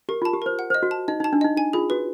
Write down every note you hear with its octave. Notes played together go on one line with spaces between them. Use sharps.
G4 A#4
F4 A5
G4
A#4 C5
F#5
C5 D#5
F#4
A5
D#4 D#5
D#4 A5
D4
D#4 D#5
D#4 G#5
F4 G#4
F#4 B4